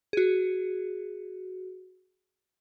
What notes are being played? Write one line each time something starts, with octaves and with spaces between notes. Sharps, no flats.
F#4 G#4